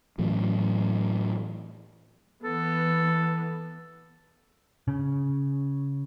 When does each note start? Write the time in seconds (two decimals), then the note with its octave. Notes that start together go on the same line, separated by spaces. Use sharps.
0.18 A2 E3 F#3
2.44 E3 B3 A4
4.88 C#3